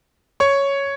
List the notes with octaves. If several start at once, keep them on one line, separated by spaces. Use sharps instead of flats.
C#5 C#6